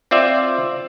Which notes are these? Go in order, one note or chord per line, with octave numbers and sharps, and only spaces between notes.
C4 F4 D5 E5